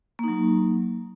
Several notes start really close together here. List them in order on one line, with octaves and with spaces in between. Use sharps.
A#3 D#4 F#3